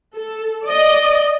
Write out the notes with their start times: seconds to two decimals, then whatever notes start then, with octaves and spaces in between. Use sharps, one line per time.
0.16 A4
0.65 D5 D#5